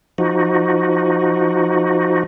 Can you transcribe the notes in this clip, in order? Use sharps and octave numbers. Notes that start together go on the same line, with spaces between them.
F3 D#4 F#4